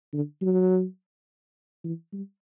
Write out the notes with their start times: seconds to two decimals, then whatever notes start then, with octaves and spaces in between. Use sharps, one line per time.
0.13 D3
0.42 F#3
1.84 E3
2.13 G3